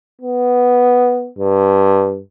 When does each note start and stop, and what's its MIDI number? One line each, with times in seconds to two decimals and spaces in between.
0.22 1.29 59
1.39 2.20 43